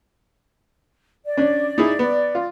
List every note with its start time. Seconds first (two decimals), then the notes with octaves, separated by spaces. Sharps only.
1.25 D5
1.37 C#4 D4
1.78 D#4 E4 G#4
1.99 B3
2.35 F4